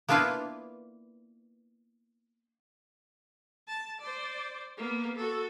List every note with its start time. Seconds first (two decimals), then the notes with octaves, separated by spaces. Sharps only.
0.09 A#3 B3 D4 E4 F4 B4
3.68 A5
4.01 C5 D5
4.77 A#3 B3
5.15 F#4 A4